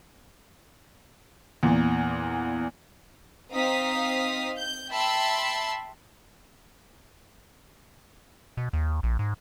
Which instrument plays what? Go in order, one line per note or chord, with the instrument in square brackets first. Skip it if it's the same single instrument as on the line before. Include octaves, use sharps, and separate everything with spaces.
[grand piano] E2 A#2
[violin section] C4 D#4 F5 D#6 B6
G6
E5 G5 A5 B5 C6 E6
[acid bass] B2
D#2
A#1
G#2